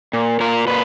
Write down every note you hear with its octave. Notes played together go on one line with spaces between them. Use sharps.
A#2
A#2 A#4
A#2 B4